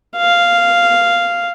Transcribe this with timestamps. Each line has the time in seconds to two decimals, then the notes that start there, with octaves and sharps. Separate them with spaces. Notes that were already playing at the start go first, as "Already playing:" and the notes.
0.17 F5